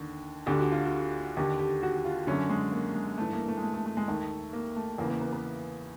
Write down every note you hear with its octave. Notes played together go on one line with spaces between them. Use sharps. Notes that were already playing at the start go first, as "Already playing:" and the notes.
Already playing: D#2 D3
D2 D3 G4
F#4
F4
F#4
D#2 D3 G4
G4
F#4
F4
F#2 D3 C#4
G#3
A#3
G#3
G2 E3 A3
A#3
A3
G#3
A3
A3
A3
G#3
D#2 D#3 A3
A#3
A3
E2 C#3 E3 A#3
A#3
B3
B3